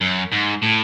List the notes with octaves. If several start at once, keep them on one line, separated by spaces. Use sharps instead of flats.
F#2
G#2
A2